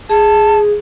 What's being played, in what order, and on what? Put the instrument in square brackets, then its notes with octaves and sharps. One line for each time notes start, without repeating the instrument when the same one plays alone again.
[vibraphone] G#4 [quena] A5